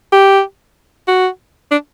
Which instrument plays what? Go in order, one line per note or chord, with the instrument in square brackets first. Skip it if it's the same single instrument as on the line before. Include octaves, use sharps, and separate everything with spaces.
[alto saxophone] G4
F#4
D4